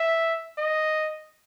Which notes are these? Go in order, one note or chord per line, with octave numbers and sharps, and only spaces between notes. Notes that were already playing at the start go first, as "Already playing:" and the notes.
Already playing: E5
D#5